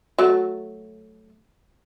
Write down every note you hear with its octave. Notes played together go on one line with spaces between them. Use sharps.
F#3 A3